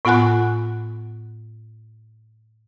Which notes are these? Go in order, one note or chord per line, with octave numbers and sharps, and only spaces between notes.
A2 B3 F4 F#5 G#5 F#6